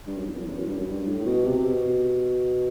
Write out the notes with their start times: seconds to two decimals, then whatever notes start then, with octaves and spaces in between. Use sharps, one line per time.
0.07 G2
0.17 F#2
0.27 E2
0.37 F#2
0.46 E2
0.57 F#2
0.67 G2
0.76 F#2
0.87 G2
1.06 A2
1.25 B2
1.46 C3
1.65 B2